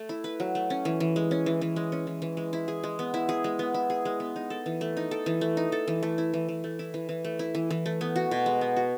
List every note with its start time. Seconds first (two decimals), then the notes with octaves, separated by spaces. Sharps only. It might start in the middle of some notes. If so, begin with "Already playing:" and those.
Already playing: A3
0.09 E4
0.24 B4
0.40 F#3
0.55 A3
0.70 C#4
0.85 E3
1.00 E3
1.16 G#3
1.31 C#4
1.46 E3
1.61 E3
1.76 G#3
1.92 C#4
2.07 E3
2.22 E3
2.37 G#3
2.53 E4
2.68 G#4
2.84 G#3
2.99 B3
3.14 E4
3.29 G#4
3.44 G#3
3.59 B3
3.74 E4
3.90 G#4
4.05 G#3
4.20 B3
4.36 D#4
4.50 A4
4.66 E3
4.81 A3
4.97 D#4
5.11 A4
5.26 E3
5.41 A3
5.57 D#4
5.72 A4
5.88 E3
6.03 A3
6.18 E4
6.34 E3
6.49 E3
6.64 A3
6.79 E4
6.94 E3
7.09 E3
7.25 A3
7.39 E4
7.55 E3
7.71 E3
7.86 A3
8.01 B3
8.16 F#4
8.31 B2
8.46 G#3
8.61 B3
8.76 F#4